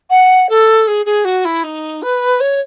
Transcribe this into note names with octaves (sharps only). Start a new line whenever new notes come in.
F#5
A4
G#4
G#4
F#4
E4
D#4
B4
C#5